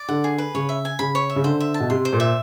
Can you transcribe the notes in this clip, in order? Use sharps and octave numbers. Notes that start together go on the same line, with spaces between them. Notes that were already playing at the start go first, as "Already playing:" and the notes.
Already playing: D5
D3 F#5
G#4
B4
C#3 C#5
E5
G#5
C#3 B5
C#5
E5
C#3
D3 C5
E5
A5
B2
C3 C6
C5
A#2
E5